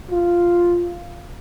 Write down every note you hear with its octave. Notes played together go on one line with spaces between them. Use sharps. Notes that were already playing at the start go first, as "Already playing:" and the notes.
F4